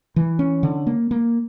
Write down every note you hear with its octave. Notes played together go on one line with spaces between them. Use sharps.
E3
C#4
D3
A#3
A#3